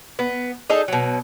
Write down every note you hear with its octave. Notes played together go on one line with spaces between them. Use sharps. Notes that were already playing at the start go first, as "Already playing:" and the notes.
B3
D#4 G#4 A4 D#5
B2 F#3